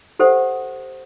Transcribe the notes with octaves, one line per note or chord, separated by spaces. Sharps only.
G4 A4 C5 E5 F#5